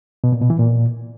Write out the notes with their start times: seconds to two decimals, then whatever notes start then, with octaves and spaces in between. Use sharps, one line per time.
0.24 B2
0.32 A#2
0.41 B2
0.50 E3
0.59 A#2